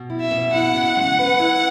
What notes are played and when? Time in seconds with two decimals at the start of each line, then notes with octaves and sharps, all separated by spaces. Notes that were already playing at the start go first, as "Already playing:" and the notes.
Already playing: B2
0.10 E4
0.21 E5
0.31 B2
0.54 E4 F#5
0.75 C#3
0.97 G#3
1.18 B4
1.40 E4